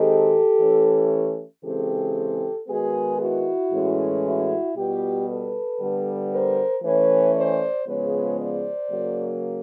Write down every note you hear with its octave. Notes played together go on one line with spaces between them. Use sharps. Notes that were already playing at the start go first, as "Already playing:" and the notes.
Already playing: D#3 G#3 C4 G4 A4
E3 A3 C#4
C#3 E3 G#3 C4 G4 A4
D#3 G#3 B3 F#4 G#4
E4 F#4
A2 E3 G#3 C#4
E4 F#4
B2 G3 B3 F4 G4
A4 B4
D3 G3 B3
A#4 C5
E3 A3 C#4 B4 C#5
C5 D5
C#3 F3 G#3 B3 B4 C#5
C5 D5
C#3 F#3 A#3